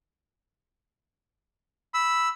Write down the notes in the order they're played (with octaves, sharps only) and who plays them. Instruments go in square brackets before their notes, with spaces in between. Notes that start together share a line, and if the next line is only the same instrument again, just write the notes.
[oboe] B5 [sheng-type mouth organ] E6